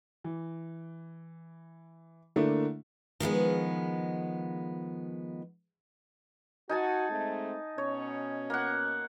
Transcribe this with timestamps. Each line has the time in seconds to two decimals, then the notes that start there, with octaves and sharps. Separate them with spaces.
0.24 E3
2.36 D3 A3 A#3 D4 E4
3.20 D#3 F3 G#3 B3
6.69 D#4 F#4 G#5 A5
7.10 G#3 A3 C4
7.78 B2 C#4 C#5
8.50 A#3 F#5